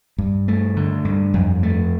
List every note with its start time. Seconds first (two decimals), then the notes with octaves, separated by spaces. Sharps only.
0.18 G2
0.48 A3
0.77 D3
1.05 G2
1.34 F2
1.63 A3